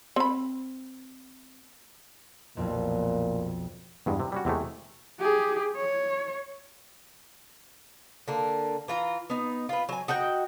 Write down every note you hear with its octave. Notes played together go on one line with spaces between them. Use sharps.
C4 B5
B1 F2 A#2
E2 G2 G#3
C3
G3 C#4 F#4
E2 C3 G#3 A3
G4 G#4
C#5
D3 A#3
E3 F4 A#5
B3 D#4
F4 B4
F#3 G#5
D#4 F#4 F#5 G5